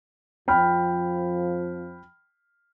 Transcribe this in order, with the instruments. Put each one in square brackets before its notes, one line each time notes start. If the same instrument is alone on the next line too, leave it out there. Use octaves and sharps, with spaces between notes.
[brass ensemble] F2 F3 [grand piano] G5 B5 F6